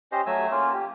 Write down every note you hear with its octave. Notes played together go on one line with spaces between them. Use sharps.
C#4 G4 C5 D#5
F#3 A3 G#5 E6
A#3 C#4 F4
G4